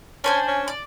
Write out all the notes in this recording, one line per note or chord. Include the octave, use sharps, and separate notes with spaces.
C#4 D4 C5 G#5
C#4
D5